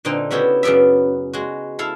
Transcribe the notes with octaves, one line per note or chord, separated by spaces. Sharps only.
A#2 D3 C4 D#4
C#3 B3 E4 F#4 G4 C#5
F#2 C#3 B3 D5 E5
G#3 F#4
E4 A4 F5